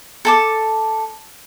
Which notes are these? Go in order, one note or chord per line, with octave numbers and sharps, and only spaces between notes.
A4 A5 D6